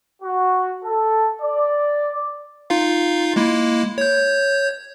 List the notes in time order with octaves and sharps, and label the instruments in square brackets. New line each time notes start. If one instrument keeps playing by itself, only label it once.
[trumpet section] F#4
A4
D5
[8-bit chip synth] D#4 F4 F5
G#3 A#3 E4
C#5 G6